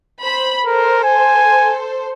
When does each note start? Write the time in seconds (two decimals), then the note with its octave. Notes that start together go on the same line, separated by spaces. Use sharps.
0.23 C5 B5
0.66 A4 A#4 C5
1.04 G#5